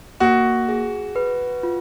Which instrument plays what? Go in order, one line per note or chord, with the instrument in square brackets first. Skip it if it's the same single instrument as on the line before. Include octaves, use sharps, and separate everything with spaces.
[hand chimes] A#3 [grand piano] F#4
[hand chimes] G#4
B4
F4